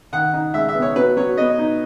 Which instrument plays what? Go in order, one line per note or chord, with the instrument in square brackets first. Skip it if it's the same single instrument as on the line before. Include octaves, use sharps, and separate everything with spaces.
[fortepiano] D#3 F#5
D#4
G#3 E5
E5
B3
C#5
F#3 B4
F#3 C#5
B3 D#5
D#4